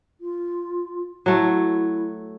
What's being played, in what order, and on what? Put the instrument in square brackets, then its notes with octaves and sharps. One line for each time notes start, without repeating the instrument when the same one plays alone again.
[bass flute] F4
[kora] F#3 A3 [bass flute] E4